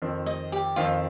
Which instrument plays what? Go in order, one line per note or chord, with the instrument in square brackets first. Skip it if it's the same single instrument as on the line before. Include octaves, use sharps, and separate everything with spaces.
[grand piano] F2 D#3 C4
[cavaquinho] D#5
G4
[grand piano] F2 D#3 C4 [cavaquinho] F4